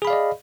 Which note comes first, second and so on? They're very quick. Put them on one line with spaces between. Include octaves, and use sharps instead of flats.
G#4 B5 F5 D5 D#5